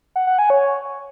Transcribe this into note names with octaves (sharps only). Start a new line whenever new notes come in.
F#5
F#5
G#5
C#5